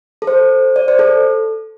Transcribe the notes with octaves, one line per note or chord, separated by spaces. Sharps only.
A4
C5
D5
C5
A4